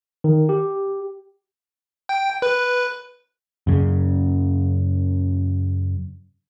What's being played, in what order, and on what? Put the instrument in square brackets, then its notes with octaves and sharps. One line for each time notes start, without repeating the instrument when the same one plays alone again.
[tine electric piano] D#3
G4
[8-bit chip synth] G5
B4
[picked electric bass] F#2 C#3